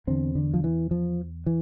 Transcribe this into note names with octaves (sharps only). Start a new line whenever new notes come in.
E2 D3 C4
D3
F3
E3
F3
E3